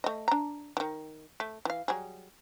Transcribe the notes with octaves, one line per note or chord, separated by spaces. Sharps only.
A3 D#5
D4 A#5
D#3 E3
A3
E3 F5
F#3 G3 G#4